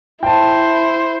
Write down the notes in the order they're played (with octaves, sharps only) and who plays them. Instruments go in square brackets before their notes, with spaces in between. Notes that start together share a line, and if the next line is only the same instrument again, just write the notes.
[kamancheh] E4 C5 [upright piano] G5 A5